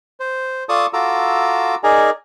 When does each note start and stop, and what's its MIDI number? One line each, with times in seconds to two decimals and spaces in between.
0.20 0.64 72
0.69 0.86 65
0.69 0.86 69
0.69 0.86 74
0.69 0.86 81
0.69 0.86 85
0.69 0.86 87
0.93 1.75 65
0.93 1.75 66
0.93 1.75 69
0.93 1.75 82
0.93 1.75 86
0.93 1.75 88
1.83 2.10 63
1.83 2.10 68
1.83 2.10 70
1.83 2.10 74
1.83 2.10 80
1.83 2.10 82